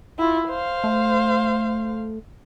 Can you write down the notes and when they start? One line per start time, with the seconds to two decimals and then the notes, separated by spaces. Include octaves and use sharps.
0.19 E4 F4
0.48 C5 F5
0.84 A3